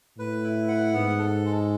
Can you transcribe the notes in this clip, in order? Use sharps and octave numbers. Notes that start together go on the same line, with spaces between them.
A2 B4
E4
F#5
G#2 B3
A4
G#3